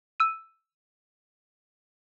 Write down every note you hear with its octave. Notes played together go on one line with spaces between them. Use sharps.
E6 D#7